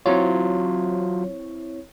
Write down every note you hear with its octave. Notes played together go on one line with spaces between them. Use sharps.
F#3 C4 E4 F4 C#5